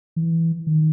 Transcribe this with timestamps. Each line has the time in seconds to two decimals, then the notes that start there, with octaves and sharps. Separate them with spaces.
0.16 E3
0.67 D#3